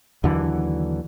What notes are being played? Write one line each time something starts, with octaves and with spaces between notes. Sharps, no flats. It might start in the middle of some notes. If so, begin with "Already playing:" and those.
D#2 D3 E3 F#3